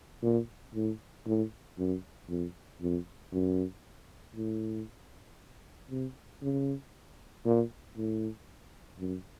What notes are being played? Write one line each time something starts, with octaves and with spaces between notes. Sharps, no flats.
A#2
A2
A2
F#2
F2
F2
F#2
A2
C3
C#3
A#2
A2
F#2